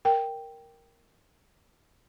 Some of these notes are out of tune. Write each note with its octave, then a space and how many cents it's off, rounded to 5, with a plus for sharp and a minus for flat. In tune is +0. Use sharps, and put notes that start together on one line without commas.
A#4 +0 G5 +0